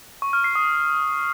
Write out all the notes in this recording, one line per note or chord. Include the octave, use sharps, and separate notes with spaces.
C#6
F6
C7
D#6